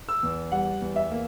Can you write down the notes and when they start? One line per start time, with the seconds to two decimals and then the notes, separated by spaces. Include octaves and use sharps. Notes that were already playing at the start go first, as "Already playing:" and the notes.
0.09 E6
0.23 E2
0.52 G3 F#5
0.81 E2
0.96 E5
1.11 A#3